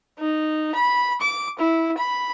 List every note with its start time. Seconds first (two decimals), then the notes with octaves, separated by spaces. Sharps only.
0.19 D#4
0.75 B5
1.21 D6
1.59 E4
1.97 B5